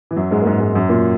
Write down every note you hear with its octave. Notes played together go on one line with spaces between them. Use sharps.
E3
F#2 F#3
G#2 G#3
A#3
G#2 G#3
G#2 G#3
F#2 F#3
A#2 A#3